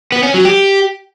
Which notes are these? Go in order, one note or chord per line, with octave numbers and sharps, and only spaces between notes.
B3
C#4
F#3
G4